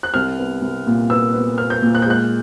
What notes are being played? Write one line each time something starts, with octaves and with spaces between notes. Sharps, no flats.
F#6
C2 F6
B3
C2
A#2
B3 E6
B3
B3 F6
G6
A#2
F#6
G6
G#3 F#6